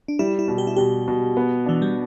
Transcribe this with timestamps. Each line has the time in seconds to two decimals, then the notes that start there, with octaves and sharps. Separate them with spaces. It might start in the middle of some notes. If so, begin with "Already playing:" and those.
0.08 D4
0.19 G3 E4
0.39 E4
0.48 B2
0.58 G4
0.67 E4
0.76 B2 G4
1.08 B2
1.37 B3
1.66 E3 D4
1.82 G3